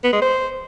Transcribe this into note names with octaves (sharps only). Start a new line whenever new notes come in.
B3
G#3
C5